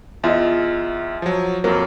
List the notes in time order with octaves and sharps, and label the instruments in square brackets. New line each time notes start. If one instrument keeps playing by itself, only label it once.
[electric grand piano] E2 E5 [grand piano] F4 D#5
[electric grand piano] F3 F#3
[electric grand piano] F2 F#3 [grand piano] A#3